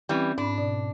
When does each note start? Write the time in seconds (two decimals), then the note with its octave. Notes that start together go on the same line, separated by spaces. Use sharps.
0.09 E3 G3 C4 C#4
0.38 G#2 D4 B5
0.58 B2 D5